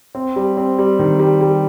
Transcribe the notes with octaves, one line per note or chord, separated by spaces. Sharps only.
C4
G3
C4
G3
D#3
G3
G3